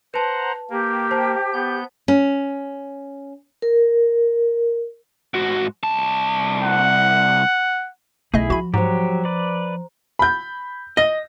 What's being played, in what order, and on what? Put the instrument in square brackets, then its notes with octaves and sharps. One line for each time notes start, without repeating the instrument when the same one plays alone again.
[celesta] B4 A5 [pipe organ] C5 F#5 A#5
[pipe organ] A#3 [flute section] G4
[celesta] C5 A5
[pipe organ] B3 G6
[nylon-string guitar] C#4
[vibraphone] A#4
[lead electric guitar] G#2 F#4
C2 A5
[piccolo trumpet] F#5
[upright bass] B1 [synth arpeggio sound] A3 D#5 [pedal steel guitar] E4 G#4
[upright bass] F3 [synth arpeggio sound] F#4 B5
[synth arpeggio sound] G#2 [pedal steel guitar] F#3 G4 [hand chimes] C5 A#5
[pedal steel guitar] B4 D5
[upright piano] B5 G6
[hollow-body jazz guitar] D#5 [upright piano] A#6